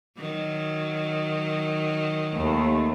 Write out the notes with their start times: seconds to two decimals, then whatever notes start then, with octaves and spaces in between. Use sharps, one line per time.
0.19 D#3 F#3
2.35 D#2 A3